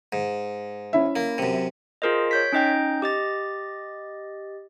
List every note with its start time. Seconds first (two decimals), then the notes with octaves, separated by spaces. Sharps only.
0.13 G#2
0.93 C#4 E4 E5
1.16 A#3
1.38 F#2 C3
2.02 F4 G#4 A#4 C5 D#5
2.31 C#5 G6 B6
2.52 C#4 D#4 D#5 G5 G6
3.02 G4 D#5 A6